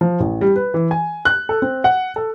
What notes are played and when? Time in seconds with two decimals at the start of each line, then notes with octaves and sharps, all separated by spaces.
0.01 F3
0.20 A1
0.41 G3
0.56 B4
0.74 E3
0.91 G#5
1.25 F#6
1.49 A4
1.62 C4
1.84 F#5
2.16 A4